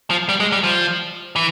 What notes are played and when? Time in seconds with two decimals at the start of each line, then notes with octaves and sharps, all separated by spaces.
0.10 F3
0.29 G3
0.40 G#3
0.52 G3
0.64 F3
1.36 E3